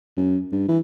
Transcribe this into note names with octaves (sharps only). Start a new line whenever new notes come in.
F#2
G2
E3